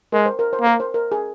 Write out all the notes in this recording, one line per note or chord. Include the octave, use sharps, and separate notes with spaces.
G#3 A#4
C5
A#4
C5
A#3
A#4
C5
A#4
G#4